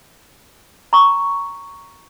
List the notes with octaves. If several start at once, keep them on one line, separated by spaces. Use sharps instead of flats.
A#5 C#6